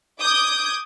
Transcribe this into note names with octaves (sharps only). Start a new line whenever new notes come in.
D6 D#6 G6 G#6